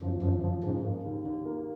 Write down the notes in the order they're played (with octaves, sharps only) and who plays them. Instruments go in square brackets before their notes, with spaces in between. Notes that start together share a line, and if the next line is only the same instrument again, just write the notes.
[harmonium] F#2 [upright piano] F3
[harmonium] F#2 [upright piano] F3
[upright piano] F3
[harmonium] G#2 [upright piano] C#3
[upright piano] A#3
D#2
D#2
A#3